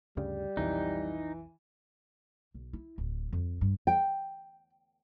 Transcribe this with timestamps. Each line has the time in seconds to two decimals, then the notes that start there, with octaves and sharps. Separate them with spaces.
0.17 D2 G2 C#3 G3
0.57 B1 F2 E3 D#4
2.54 B1
2.73 E4
2.98 D1
3.33 F2
3.61 G2
3.87 G5